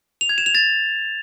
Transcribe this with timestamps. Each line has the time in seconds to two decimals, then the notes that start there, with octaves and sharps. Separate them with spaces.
0.21 F7
0.29 G#6
0.38 E7
0.46 F7
0.55 A6